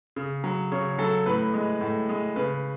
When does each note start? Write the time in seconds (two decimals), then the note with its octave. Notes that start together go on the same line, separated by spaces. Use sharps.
0.16 C#3
0.44 F#3
0.72 C#3 C#5
0.98 F#3 A4
1.26 A2 B4
1.54 G#3
1.81 A2
2.09 G#3
2.36 C#3 B4